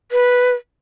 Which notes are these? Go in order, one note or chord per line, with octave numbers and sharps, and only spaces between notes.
B4